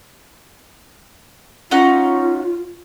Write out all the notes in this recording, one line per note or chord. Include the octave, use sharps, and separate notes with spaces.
C#4 D#4 F4 F#5